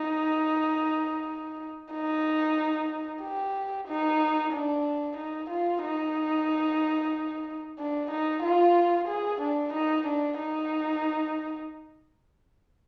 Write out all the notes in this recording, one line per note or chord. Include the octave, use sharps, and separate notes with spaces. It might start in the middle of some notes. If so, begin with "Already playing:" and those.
Already playing: D#4
D#4
G4
D#4
D4
D#4
F4
D#4
D4
D#4
F4
G#4
D4
D#4
D4
D#4